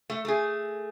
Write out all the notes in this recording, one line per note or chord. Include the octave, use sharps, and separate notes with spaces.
A3
A3 G#4